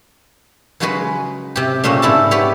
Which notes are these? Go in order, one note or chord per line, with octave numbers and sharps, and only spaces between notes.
C#3 F#3 G#3 F#4 G#4 B4
C3 G4
A#2 C#3 A3 A#3 C4 C#4
G#2 G3 C4 E4 A4 A5
B3 G4 B4 C#5